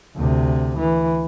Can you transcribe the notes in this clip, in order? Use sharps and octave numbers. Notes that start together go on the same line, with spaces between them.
D2 C3
E3